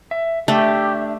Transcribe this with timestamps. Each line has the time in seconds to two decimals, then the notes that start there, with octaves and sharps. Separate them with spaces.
0.11 E5
0.48 A3 D4 G4 E5